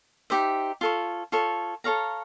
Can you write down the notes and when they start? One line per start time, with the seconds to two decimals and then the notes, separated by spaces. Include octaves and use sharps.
0.30 D#4 G4 C5 E5
0.81 F4 A4 C#5
1.32 F4 A4 C#5
1.84 A4 C#5 F5 A#5